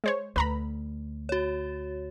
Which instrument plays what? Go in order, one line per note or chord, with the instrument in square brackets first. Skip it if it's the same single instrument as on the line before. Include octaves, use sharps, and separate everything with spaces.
[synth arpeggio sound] G#3 C5 C#5
[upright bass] D2 [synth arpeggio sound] B4 A#5 B5
[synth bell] F#4 C#5